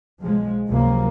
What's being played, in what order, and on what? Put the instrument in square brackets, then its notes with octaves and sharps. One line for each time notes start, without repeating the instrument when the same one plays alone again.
[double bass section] B1 F3 G#3
C#2 G2 C3 F3 F#3 A#3